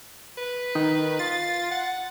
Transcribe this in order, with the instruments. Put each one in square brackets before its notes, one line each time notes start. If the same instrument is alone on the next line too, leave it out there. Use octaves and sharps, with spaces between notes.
[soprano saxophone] B4
[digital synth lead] D#3
[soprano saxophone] F4 [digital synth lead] A6
[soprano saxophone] F#5